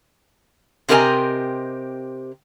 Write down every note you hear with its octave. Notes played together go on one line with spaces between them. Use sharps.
C3 C4 G4 A#4 D#5 G#5